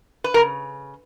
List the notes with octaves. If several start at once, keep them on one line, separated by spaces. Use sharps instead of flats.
B4
C#3 A#4